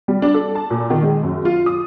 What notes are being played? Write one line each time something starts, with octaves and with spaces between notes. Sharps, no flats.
G3
D4
A4
A5
A#2
D#3
G#3
F#2
F4
D#6